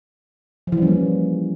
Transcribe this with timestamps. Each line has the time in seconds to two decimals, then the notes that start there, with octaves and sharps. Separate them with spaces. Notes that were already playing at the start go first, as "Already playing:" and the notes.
0.67 F3
0.72 E3
0.77 G3
0.82 C#4
0.87 A#3